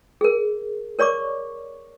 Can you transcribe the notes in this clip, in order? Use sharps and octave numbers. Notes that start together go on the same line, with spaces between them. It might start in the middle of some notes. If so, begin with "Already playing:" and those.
G#4 A#4
A#4 C#5 D5 C#6 D6